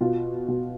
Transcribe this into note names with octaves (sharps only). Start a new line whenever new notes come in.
B2 F4
B2